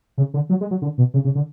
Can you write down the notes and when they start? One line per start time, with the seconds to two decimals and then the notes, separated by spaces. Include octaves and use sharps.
0.18 C#3
0.34 D3
0.50 F#3
0.61 G#3
0.71 F#3
0.82 D3
0.98 B2
1.14 C#3
1.25 C#3
1.35 D3